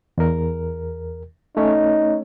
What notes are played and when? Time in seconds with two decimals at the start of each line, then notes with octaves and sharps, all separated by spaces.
0.18 E2 A#4
1.57 A3 C#4 D#4 C#5